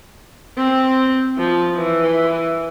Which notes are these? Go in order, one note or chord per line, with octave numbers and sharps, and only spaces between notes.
C4
F3
E3